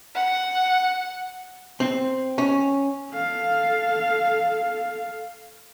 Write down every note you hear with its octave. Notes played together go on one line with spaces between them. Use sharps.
F#5
C4
C#4
A4 F5